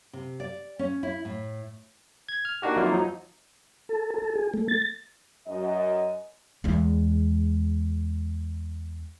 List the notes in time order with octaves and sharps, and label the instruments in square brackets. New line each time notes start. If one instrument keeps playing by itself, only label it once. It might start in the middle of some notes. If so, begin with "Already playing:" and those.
[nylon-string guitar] C3
D5
C#4
E4
A2
[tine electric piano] G#6
F6
A#3 D4 D#4 F#4 G4
F2 D#3 F#3 A#3 E4 F4
F3 F#3 D#4
[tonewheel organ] A4
A4
G#4
A3
A6
[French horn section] F#2 D#5
[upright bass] E2 G#3